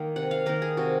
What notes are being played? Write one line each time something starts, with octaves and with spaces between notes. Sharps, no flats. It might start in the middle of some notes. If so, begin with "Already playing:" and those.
Already playing: D#3 A#3
C3 F#5
F5
D#3 A#3 A#4
G#4
C3 F#4